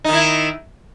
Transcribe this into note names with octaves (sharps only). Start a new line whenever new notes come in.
D#3 D#4 E4